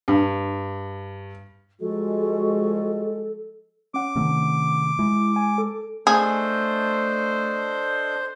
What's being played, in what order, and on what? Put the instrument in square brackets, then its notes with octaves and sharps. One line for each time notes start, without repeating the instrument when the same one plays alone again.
[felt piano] G2
[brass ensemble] F3 G3 G#3 [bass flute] F#4 [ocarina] A4
[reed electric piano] C#4 F#5 [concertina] D6
[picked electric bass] C3 D#3 A3
[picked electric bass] G#3 [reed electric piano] E4
[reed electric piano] G#5
A4
[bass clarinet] A3 [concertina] D4 A4 D#5 [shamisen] G#4 [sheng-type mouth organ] C5